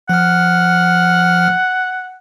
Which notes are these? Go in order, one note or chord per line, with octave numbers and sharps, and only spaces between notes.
F3 F#5 F6